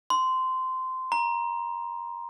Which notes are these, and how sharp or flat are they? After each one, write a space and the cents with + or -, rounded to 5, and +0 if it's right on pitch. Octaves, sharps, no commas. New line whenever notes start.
C6 -15
A#5 +20